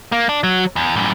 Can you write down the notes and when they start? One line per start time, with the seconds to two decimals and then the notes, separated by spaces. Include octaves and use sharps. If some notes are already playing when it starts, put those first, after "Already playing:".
0.12 A#3
0.29 D4
0.43 F#3
0.76 E2
0.96 F#2 A2